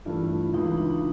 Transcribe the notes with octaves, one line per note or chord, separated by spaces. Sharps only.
G2 E3 A3 F4
C#2 C#3 E3 G#3 D#4
D4
D4